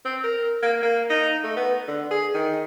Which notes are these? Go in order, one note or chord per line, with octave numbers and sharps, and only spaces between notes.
C4
A#4
A#3
A#3
D#4
A3
B3
D3
G#4
D#3